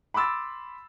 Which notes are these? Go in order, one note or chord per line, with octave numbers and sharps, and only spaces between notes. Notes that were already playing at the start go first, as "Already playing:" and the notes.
B5 C6 D6 E6 A6